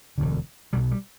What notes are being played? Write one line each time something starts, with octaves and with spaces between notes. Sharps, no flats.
E1 D2 D3
B1 B2 G3
G3